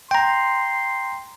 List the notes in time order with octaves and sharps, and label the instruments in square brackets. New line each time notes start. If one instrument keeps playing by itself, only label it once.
[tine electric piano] G5 A#5 [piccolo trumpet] C6